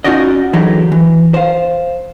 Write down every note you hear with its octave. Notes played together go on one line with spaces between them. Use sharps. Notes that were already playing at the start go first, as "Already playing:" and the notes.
C#4 D#4 F4 F#4 D5 D#5
D3 E3 F#3 G#3 D#4 G4
E3
C5 F5